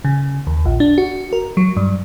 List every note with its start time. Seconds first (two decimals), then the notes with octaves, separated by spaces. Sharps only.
0.05 C#3
0.47 D#2
0.65 A#1
0.80 D4
0.98 F#4
1.33 A#4
1.57 F#3
1.77 G2